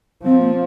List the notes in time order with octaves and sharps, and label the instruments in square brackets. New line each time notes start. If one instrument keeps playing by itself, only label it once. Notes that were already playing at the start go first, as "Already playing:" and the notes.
[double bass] F3 [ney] C4
[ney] A#3